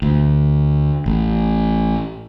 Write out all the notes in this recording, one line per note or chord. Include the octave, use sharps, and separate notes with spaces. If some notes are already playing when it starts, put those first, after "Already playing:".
D2
A1